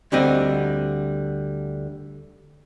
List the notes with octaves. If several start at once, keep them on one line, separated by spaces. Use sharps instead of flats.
D2 D3 G3 C4 D#5